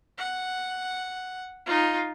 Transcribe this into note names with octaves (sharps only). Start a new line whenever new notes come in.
F#5
D#4 F4